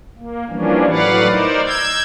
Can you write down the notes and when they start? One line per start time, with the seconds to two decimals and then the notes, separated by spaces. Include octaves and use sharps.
0.17 A#3
0.49 E3 F3 G3 A#3 C#4 D4
0.88 A2 F#3 B4 D5 F5 F#5
1.28 D#4 A#4 C5 D5
1.66 E6 G6 G#6